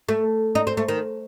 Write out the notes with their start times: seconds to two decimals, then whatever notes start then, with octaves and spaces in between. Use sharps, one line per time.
0.09 A3
0.55 D#4
0.67 C4
0.77 A3
0.88 D#3